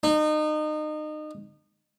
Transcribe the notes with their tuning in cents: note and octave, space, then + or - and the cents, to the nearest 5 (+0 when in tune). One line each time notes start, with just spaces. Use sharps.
D#4 -30